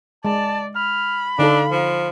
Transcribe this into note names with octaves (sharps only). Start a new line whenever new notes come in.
G#3 D5 A5
B5 F6
D3 D4 D#4 A4 F5
F3